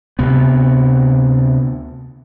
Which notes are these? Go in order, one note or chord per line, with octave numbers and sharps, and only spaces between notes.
D2 C3 B3